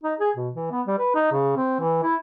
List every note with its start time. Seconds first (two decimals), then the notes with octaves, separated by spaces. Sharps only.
0.04 D#4
0.20 G#4
0.36 B2
0.54 E3
0.71 B3
0.87 G3
0.99 B4
1.15 D#4
1.32 C#3
1.57 C4
1.80 E3
2.03 E4